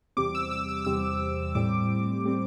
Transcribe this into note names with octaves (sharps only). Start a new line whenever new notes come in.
E2 C3 G3 C4 D6
E6
E6
E6
D6
E2 C3 G3 C4 E6
A2 G3 C4 D6
A2 G3 C4